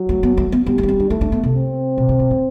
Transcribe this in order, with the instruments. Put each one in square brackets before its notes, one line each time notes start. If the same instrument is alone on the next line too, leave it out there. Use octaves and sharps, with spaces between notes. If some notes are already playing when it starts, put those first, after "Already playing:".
Already playing: [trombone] F#3
[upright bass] A3
B3
A3
B3
[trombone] G3 [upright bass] B3
[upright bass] A3
D4
C4
D4
[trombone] A3 [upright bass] E4
[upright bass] D4
B3
C3
[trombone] C4
[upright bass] B2
C3
B2
A2